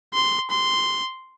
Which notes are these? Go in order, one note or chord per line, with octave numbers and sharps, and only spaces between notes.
C6
C6